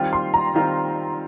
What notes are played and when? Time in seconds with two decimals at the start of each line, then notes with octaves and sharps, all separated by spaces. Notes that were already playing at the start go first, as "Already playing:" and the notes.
Already playing: D#3 G3 C4 F4 G5
0.13 C6
0.34 A#5
0.54 D#3 G3 C4 F4